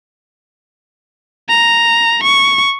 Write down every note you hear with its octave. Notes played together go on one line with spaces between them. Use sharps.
A#5
C#6